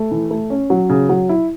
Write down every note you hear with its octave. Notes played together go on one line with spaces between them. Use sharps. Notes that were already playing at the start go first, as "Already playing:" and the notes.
Already playing: A3
E3
A3
C#4
F#3
C#3
F#3
E4